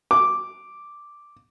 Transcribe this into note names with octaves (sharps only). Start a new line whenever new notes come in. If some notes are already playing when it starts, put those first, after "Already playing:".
D6